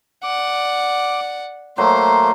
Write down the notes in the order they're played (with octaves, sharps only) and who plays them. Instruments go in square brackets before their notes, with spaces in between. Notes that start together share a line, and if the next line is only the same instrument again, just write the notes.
[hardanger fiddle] D5 F#5 [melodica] D6
[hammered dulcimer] F#3 [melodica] A3 A#3 C6 [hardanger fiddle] C5